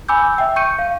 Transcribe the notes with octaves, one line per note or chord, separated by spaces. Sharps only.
G#5 B5 D6 E6 G6
E5 G5 E6
C#6 G6 C#7 D#7
F5